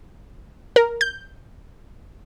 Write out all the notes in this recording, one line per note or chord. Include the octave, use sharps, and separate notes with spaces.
A#4
G6